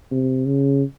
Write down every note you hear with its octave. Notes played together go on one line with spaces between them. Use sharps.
C3
C#3